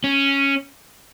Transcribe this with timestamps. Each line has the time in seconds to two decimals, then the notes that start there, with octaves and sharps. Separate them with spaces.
0.04 C#4